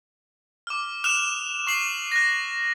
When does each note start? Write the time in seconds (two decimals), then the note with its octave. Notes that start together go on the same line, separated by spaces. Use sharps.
0.67 D6 F6
1.04 D#6 F6 F#6 E7 F7
1.67 C#6 C7 F#7
2.12 F#6 A#6